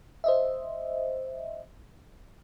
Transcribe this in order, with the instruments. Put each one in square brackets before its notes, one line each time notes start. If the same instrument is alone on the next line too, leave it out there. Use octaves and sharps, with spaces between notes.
[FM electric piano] C5 D#5 E5